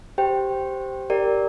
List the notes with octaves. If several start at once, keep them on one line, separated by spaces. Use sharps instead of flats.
G4 C5 G5
G4 A#4 D5